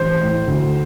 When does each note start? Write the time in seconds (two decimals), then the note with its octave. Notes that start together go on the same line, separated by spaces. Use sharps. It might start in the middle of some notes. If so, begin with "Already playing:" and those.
Already playing: A1 C5
0.21 A2
0.47 D2